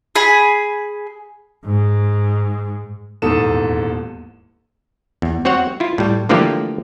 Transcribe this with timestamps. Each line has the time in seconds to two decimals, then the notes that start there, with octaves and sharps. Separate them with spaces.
0.16 G#4 G#5 B5
1.66 G#2
3.22 D#1 E2 G#2 A4 D#6 E7
5.22 E2
5.45 C4 F#4 C#5 F#5
5.80 E4 F4
5.98 A2 G3
6.29 D3 E3 F3 A3 A#3 G4